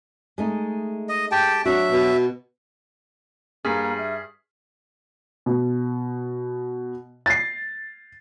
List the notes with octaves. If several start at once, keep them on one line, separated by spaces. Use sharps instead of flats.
G#3 A3 D#4
D#5
G4 G5 A5
F#3 D4 F#4 E5
B2
G2 A#3 G#4 F6 B6 C7
E5
B2
A6 C7